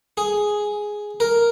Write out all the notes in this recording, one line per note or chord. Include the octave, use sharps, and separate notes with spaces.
G#4
A#4